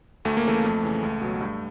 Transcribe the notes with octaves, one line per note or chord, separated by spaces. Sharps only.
D2 A3
A#3
C#3 E3 A3
F2
C#3 E3
C#2
B2 F#3
G2